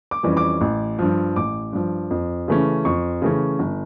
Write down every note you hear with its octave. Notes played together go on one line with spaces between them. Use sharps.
D6
F2 E3 G3 C#4
D6
A1
G2 F3
A1 D6
G2 F3
F2
C#3 E3 A3 C#4
F2 C#6
C#3 E3 A3 C#4
G1